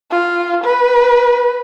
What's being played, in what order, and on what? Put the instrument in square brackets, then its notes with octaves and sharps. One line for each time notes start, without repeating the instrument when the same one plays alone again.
[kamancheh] F4
B4